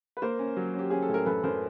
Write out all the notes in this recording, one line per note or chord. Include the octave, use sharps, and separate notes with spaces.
B4
A#3 A#4 C5
C#4
F#3
C#4 G4
C#4 G#4
A4
A2
A#4
F#2 A4 B4
F#2 A#4 C5